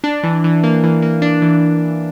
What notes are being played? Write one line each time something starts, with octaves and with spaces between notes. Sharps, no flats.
D4
E3
E3
A#3
E3
A#3
D4
E3